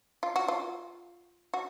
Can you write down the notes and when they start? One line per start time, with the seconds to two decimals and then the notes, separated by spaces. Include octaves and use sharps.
0.23 F4
0.36 F#4
0.48 F4
1.54 F#4